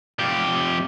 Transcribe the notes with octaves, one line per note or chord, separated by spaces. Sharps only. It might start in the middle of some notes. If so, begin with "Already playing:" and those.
F2 G4